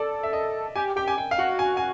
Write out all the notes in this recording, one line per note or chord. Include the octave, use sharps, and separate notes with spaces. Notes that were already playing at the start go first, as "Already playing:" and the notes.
Already playing: A4 D5
E5
D#5
G4 G#5
G4 G5
G#5
G5
F5
F#4 F#5
G#5
G#5